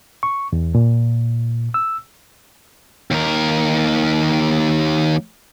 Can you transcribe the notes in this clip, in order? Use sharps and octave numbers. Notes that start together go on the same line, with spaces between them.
C#6
E2
A#2
E6
D#2 A#4